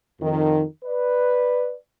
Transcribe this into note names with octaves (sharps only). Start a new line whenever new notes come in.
F2 D#3
B4 D5